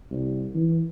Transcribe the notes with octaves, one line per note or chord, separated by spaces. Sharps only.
C2
E3